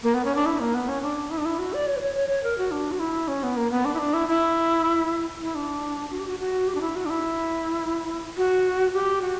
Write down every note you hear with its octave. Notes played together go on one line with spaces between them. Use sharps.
A#3
B3
C#4
D4
E4
A#3
B3
C#4
D4
E4
D4
E4
F#4
D5
C#5
B4
C#5
C#5
C#5
A#4
F#4
D4
F#4
E4
C#4
B3
A#3
B3
D4
E4
D4
E4
E4
E4
D4
F#4
G4
F#4
F#4
G4
D4
E4
F#4
D4
E4
F#4
G4
F#4